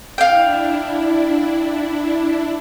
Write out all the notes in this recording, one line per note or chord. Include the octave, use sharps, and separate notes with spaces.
D4 E4 F5 G5